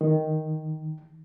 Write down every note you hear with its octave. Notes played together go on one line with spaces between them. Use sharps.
D#3